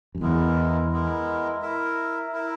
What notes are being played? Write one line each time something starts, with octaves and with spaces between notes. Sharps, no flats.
F#2
E2 G#3 B3 E4 A#4
G#3 B3 E4 A#4
E4 A#4 E5
E4 A#4 E5